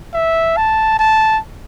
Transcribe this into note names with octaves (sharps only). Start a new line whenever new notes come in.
E5
A5
A5